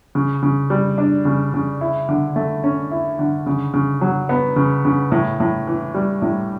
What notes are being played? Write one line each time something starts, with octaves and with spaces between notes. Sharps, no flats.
C#3
C#3
G3
D4
C#3
C#3
E4
D3
A3
C#4
E4
D3
C#3
C#3
F#3
B3
C#3
C#3
A2
A2
E3
G3
A2